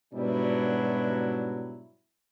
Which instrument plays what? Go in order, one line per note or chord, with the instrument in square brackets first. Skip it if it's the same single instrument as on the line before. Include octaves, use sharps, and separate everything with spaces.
[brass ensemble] G#2 B2 F#3 G3 D4 E4